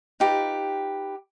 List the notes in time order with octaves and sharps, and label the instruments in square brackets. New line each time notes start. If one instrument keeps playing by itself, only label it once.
[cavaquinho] D#4 F4 G4 B4